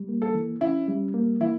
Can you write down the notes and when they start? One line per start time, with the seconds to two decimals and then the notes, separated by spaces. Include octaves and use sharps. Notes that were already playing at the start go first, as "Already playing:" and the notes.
Already playing: G3
0.08 A#3
0.22 A4
0.35 E3
0.61 C#4 E4
0.88 G3
1.14 A#3
1.41 E3 E4